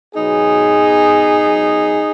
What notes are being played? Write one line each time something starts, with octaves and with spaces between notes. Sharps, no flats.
B2 F#3 B3 D#4 G#4
B2 B3
F#2 F#3 B3